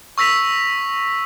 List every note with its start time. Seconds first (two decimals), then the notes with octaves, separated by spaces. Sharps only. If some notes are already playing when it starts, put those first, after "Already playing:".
0.18 C#6 E6 A#6 B6 F7